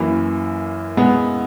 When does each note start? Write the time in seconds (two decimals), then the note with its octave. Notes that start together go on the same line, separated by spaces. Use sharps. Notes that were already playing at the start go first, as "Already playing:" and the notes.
Already playing: F#2 E3 A#3 E4
0.97 G#3 B3